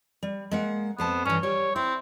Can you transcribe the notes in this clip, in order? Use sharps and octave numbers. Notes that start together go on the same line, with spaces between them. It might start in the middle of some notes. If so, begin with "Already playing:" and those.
G3
G#3 A#3 F#5
F2 B3 C5 A5
G2 E3 C#4
G3 C#5
C4 E4